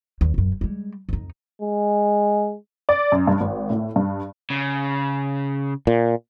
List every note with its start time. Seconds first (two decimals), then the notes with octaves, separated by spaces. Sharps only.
0.21 D#2
0.34 D#1 F#2
0.61 G3 G#3
1.09 F2 D#4
1.62 G#3
2.89 D5
3.12 F#2
3.27 G2
3.41 G#1
3.70 A2
3.96 G2
4.50 C#3
5.87 A#2